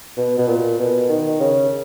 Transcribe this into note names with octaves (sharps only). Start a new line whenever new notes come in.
B2
B2
A#2
B2
D#3
C#3